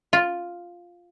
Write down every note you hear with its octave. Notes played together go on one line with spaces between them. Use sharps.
F4